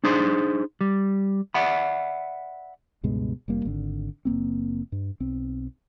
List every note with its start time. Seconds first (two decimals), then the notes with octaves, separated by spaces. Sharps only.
0.04 D4 D#4 G#4 C5 C6
0.81 G3
1.54 D5 E5 F#5 B5
3.03 C#2 G2 B2 G#3
3.48 F1 G3 A#3
3.65 G#1 D3
4.25 F#1 G#2 A#3 C4
4.92 G2
5.20 B1 C4